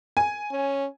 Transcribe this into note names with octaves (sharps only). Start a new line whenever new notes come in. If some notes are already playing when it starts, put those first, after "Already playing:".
G#5
C#4